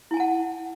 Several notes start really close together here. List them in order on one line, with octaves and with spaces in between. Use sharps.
E4 G#5 A5 F#5